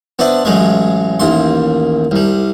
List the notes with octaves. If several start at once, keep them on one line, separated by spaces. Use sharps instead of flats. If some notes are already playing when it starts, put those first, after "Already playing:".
B3 D4 C5 E5 A5
A1 F#3 G#3 A3 E5
A1 D#2 E5 C6
C2 G3